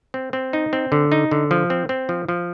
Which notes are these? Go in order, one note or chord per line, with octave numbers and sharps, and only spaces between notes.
C4
C4
D#4
C4
D3
D#4
D3
F3
C4
C4
F3
F3